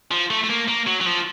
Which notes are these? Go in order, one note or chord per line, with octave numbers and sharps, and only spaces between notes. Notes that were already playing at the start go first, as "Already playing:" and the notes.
F3
A3
A3
A#3
A#3
F#3
F#3
F3